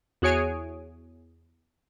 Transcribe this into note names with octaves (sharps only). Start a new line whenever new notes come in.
E2 F#4 G#4 C#5 G#5 D7